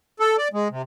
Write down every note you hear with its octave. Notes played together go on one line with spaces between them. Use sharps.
A4
D5
G#3
C3